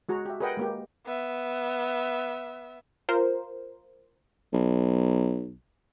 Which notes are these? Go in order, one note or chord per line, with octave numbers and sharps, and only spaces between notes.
G#3 F#4 G#4 A#5
G4 E5
G#4 A#4 B4 D#5 F#5 G5
G#3 A#3 G4
B3 E5
F4 A#4 C5
B1